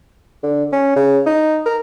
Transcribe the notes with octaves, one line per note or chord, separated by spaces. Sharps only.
D3
C#4
C#3
D#4
A#4